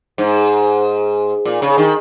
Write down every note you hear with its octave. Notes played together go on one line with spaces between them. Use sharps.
G#2
A#2
C#3
D#3